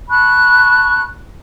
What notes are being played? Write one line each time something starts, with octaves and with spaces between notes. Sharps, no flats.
A5 B5 C#6 F#6